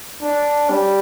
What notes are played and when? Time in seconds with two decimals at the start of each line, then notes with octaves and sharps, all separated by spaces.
0.22 D4
0.70 G3